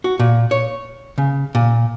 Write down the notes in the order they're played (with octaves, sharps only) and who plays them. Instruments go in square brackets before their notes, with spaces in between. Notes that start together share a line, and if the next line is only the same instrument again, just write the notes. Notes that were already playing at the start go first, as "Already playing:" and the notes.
[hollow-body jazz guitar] F#4
A#2
C#5
C#3
A#2